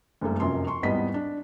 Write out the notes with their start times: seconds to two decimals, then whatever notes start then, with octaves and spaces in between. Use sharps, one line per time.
0.21 F#1 G2 A3 A#3
0.40 F1 F#2 C#4 F4 A#4 C6
0.67 C6 C#6
0.82 G#1 E2 G3 B3 D#5 B6
1.14 D4